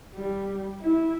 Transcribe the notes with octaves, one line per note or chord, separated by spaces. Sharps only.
G3
E4